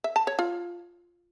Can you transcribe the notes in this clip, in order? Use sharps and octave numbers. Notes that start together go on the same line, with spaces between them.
E5
A5
C#5
F4